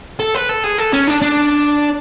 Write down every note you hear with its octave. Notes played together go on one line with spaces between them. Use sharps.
A4
B4
A4
G#4
A4
C#4
D4
D4